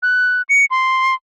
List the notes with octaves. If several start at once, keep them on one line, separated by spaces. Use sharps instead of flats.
F#6
C#7
C6